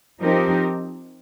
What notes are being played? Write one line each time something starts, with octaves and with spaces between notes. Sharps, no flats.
F3 C4 D#4 G4 A#4